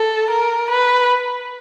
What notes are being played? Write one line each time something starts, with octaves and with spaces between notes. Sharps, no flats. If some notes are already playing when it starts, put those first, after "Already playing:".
Already playing: A4
A#4
B4